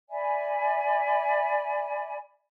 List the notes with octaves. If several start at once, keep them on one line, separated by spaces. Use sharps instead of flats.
D5 E5 G#5 B5